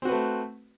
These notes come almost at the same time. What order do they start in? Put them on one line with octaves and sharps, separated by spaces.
C4 F#4 B4 A3